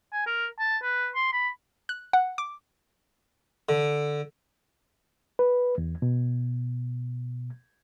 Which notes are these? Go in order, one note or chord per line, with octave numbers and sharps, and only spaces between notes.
G#5
A#4
A5
B4
C6
B5
F#6
F#5
D6
D3
B4
E2
B2